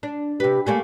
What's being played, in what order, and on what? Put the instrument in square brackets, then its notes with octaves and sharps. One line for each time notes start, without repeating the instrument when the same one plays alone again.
[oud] D4
[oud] C3 B4 [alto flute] G4
[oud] G3 A3 A#3 [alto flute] G#5